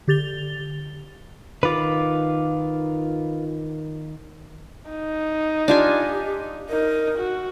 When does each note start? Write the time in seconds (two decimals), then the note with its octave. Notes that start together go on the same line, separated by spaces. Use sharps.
0.08 D3 G4 A6 F7 G7
1.63 D#3 F4 B4 F5 D6
4.90 D#4
5.68 D4 F4 G4 G#5
6.69 D#4 A#4
7.19 F#4